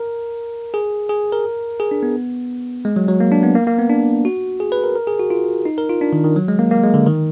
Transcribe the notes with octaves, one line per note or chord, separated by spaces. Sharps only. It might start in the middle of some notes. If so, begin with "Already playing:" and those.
Already playing: A#4
G#4
G#4
A#4
G#4
D4
B3
G#3
F#3
F#3
A#3
D4
B3
A#3
A#3
B3
D4
F#4
G#4
B4
A#4
A#4
G#4
F#4
F4
D#4
A#4
F4
D4
D#3
D#3
F#3
G#3
A#3
A#3
G#3
D3
D#3